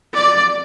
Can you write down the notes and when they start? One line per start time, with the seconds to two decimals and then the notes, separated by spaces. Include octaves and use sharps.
0.14 D5